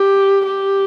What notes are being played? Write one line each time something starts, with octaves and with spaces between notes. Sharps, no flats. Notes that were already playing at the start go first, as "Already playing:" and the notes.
Already playing: G4
G4